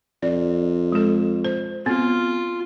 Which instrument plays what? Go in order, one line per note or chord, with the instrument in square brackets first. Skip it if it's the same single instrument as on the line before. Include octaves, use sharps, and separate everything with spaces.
[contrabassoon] F2 [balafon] D5
[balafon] G#3 A4
C5
[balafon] B3 C4 [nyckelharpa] F4